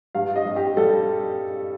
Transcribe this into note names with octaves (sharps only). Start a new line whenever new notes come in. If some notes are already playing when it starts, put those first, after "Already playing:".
G2 F5
D#5
G3
G4
G3 A4